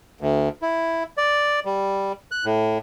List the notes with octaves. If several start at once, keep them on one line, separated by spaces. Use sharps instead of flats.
D2
E4
D5
G3
F#6
A2